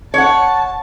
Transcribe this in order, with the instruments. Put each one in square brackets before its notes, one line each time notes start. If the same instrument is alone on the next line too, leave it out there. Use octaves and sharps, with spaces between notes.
[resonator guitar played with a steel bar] C#5 F#5 [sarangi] A5